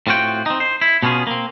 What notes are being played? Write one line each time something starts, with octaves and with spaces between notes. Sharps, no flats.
A2 C4 F4 F#4 G5
C4 D#4
C5
E4
B2 B3 C#4 F4 G#4
A#3 C4